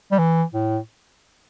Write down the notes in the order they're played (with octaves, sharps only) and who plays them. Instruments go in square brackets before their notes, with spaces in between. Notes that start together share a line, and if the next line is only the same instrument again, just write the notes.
[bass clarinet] G3
E3
A2